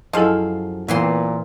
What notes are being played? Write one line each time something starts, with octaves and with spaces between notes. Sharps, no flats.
F#2 F3 E4 G#4 A4 D#5 F5
A#2 E3 B3 C4 C6